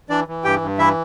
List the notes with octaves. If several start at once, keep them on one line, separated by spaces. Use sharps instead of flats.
E3 D4 D5
E3
G2 G4 G5
G2
E3 E4 E5